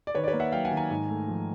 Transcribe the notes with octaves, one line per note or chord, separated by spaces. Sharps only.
D5
D#3 B4 C#5
D5
B4 C#5
A#3
E5 F#5
F#3 F5 G5
F#5 G#5
D#3
G#5 A#5
G#2
A3
F3